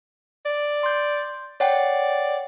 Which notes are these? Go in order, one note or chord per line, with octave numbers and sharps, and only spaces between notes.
D5
C6 G6
C#5 D5 F#5 G5